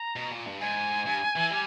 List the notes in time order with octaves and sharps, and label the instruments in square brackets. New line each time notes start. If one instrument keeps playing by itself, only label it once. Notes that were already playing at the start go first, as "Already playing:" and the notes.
Already playing: [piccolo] A#5
[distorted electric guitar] B2
A#2
G2
[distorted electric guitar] G#2 [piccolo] G#5
[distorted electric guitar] G2
E3
G3